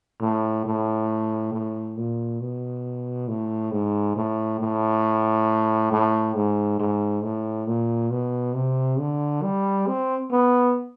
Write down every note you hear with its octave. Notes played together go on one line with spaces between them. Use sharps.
A2
A2
A2
A#2
B2
A2
G#2
A2
A2
A2
G#2
G#2
A2
A#2
B2
C3
D3
G3
C4
B3